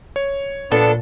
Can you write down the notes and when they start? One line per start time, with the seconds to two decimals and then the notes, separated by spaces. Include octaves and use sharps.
0.16 C#5
0.72 A#2 F3 B3 D4 A4